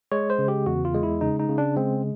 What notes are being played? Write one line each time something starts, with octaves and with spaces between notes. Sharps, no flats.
G#3 C#5
C5
C#3
G4
E2 F#4
F4
G#3
E4
C#3 D#4
D#4
C#3
D4
G#3 C4